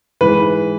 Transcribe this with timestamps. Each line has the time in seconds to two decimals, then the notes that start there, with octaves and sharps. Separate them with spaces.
0.21 G#2 E3 B4